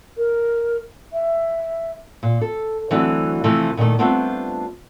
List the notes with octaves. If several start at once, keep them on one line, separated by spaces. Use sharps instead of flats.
A#4
E5
A#2
A4
D2 E3 F#3 A3 C4 D4
C3 E3 F3 A3
A#2 D3 D#3 A3
G3 A3 B3 C4 D4 F4